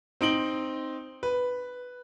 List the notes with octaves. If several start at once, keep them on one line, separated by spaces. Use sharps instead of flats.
C4 D#4 D7 F#7 G7
B4